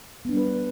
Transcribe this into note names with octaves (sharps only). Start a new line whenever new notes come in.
G3 B3 D4 B4